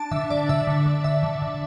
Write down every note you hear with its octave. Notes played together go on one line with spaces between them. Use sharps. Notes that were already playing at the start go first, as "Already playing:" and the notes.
Already playing: D4 A5
D3 E5
D3 D5
D3 E5
D3
D3
D3 E5
D3
D3